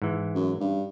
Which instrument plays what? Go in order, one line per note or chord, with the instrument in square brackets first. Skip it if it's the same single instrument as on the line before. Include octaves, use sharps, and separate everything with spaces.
[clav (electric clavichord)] G#2 E3
[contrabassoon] F#2
G2